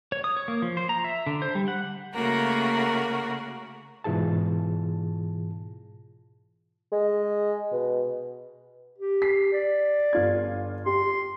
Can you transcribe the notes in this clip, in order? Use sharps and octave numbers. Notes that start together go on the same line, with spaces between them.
C#5
D#6
C#5
A#3
F3
C5
A#5
E5
D3
C5
G3
F#5
C#3 A3 A#3 F#4 A#4
G#2 B2 E3 F4 G#4 A5
G#3
B2
G4
B6 C7
D5
G1 F4 G#6
G4 C6